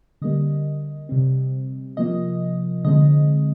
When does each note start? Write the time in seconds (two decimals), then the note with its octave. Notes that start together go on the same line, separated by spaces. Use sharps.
0.22 D3 G3 A#3 D#5
1.09 C3 G3 C4
1.97 C3 F3 A#3 D#5
2.85 D3 G#3 C4 D#5